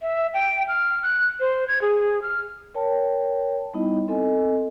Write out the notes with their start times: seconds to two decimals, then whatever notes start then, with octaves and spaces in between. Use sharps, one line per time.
0.02 E5
0.34 G5
0.68 F6
1.03 F#6
1.40 C5
1.68 G#6
1.82 G#4
2.22 F6
2.74 A#4 C#5 G5 A5
3.74 G3 B3 D#4 E4 D#5
4.08 C4 A4 D#5 G#5